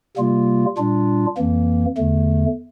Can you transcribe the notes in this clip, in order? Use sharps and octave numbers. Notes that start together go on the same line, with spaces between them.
C3 G3 A#3 F4
A#2 G3 D4 F4
F2 E3 A#3
E2 D3 A3